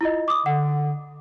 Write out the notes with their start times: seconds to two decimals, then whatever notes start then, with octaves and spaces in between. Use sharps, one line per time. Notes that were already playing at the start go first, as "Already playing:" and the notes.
0.01 E4 F4 D#5
0.28 D6 D#6
0.46 D3 F#5